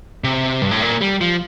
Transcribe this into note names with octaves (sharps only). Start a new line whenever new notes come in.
C3
G2
A2
A#2
G3
F3